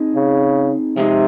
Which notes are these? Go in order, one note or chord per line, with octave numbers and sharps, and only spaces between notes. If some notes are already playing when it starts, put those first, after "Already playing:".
Already playing: C4 D#4 G#4
C#3
C3 F3 G#3 D#4 G#4